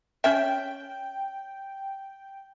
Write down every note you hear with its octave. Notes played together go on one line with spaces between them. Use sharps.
C#4 E5 G5